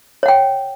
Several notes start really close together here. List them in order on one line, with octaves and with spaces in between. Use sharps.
C#5 F#5 G5